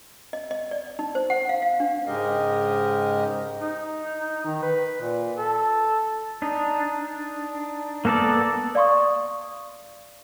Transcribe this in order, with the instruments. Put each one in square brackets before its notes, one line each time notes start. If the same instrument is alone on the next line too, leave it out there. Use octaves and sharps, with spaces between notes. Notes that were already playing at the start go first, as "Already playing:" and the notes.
[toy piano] D#5
D#5
D5
D#4
C5
F#5
F5
F5
D4
[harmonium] G#2 C#3 G#3 G4 A#4 D#5
[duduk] D#4
D#3
B4
A#2
A4
[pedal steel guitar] D4 D#4
A#3 B3 A4 A#4 D5
[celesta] D5 F5 C6 C#6 D#6